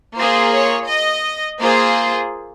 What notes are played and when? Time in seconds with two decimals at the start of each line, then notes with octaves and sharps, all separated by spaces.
0.17 A#3 F4 G#4 C5
0.52 C#5
0.88 D#5
1.59 A#3 F4 G#4 C5